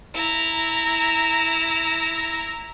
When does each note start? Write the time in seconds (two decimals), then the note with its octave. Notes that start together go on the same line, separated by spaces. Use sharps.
0.14 E4 A#5